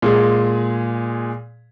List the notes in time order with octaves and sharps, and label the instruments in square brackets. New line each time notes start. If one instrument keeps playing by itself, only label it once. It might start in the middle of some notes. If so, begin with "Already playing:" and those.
[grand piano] A#2 G#3 G#4